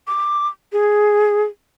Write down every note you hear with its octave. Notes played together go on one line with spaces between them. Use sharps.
D6
G#4